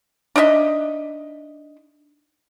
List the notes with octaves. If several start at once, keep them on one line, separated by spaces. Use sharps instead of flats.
D4 D#4 D#5 E5